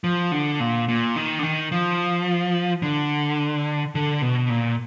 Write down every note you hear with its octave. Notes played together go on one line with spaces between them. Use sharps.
F3
D3
A#2
A#2
D#3
D3
D#3
F3
D3
D3
B2
A#2